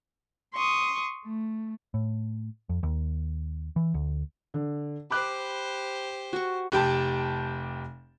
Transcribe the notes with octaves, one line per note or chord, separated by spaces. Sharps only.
C6 C#6 D#6
A3
A2
F2
D#2
E3
D2
D3
G4 C5 B5 D6 F#6
F#4 C#6
F1 G4 G5 A5